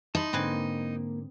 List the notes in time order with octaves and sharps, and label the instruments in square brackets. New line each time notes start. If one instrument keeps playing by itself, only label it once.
[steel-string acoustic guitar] D#4 [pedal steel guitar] A5 B5 C6
[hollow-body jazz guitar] G#2 D3 [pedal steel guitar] A#3 [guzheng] C4 B4 G#5